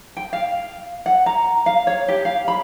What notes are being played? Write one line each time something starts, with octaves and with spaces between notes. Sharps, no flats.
G5
F5
F#5
A#5
F5
C#5
G4
F5
B5